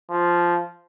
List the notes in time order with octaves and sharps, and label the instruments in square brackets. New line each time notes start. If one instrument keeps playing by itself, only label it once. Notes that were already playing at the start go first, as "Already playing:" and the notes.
[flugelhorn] F3